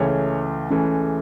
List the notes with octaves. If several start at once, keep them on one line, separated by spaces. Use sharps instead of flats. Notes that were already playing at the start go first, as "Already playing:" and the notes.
Already playing: C#2 C#3 E3 A3 C#4 C#5
C#2 C#3 E3 A3 C#4